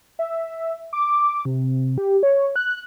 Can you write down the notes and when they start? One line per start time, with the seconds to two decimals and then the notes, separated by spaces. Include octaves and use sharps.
0.19 E5
0.93 D6
1.45 C3
1.98 G4
2.23 C#5
2.56 F#6